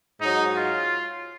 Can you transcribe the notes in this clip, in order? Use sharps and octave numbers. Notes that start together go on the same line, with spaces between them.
G#2 F#3 D#4
F4